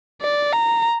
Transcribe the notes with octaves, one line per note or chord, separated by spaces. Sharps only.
D5
A#5